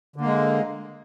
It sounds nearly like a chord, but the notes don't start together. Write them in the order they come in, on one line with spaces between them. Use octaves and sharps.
D3 A#3 G#3